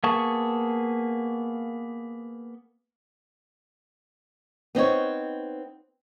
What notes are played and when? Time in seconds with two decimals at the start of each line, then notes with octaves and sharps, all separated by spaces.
0.04 A#3 B3 G#4 A5 C#6
4.75 B3 C4 D#4 C#5